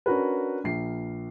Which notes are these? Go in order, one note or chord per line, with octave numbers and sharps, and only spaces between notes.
C#4 D4 F#4 A#4 B4
A#1 C7